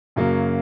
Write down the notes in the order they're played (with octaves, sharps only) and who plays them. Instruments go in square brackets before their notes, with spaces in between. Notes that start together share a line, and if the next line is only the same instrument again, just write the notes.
[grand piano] F#2 C#3 F#3 A#3